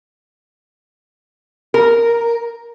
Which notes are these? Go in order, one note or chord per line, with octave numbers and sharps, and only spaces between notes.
A#4